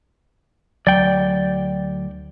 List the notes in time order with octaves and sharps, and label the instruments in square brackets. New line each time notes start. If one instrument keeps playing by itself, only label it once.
[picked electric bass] D2 F#3 [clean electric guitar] D5 G5